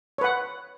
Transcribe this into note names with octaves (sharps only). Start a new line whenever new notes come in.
B4 C#5 F#5